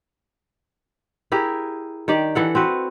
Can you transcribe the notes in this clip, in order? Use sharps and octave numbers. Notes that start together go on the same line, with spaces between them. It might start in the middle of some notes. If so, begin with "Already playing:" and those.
E4 G4 G#4 A#4
D#3 G4 D5
E3 A4 F#5
C4 F#4 B4